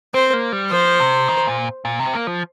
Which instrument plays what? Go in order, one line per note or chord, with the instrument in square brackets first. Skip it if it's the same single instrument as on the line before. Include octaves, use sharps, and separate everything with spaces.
[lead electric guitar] C4 [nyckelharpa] C5
[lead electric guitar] A#3
G3
[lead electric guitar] F3 [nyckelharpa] C5
[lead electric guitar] C3
D#3
A#2
A#2
C3
C4
A#3
F3